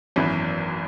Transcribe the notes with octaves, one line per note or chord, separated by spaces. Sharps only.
G#1 F#2 E3 B3